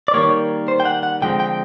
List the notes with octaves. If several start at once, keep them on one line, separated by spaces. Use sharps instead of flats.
D5
D#3 G3 A#3 C#5
C5
G5
F#5
F#5
D3 F3 G#3 C4 G5
G5